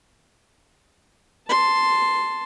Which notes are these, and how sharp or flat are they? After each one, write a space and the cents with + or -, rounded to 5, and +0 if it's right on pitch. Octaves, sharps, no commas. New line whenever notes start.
A5 +0 C6 +0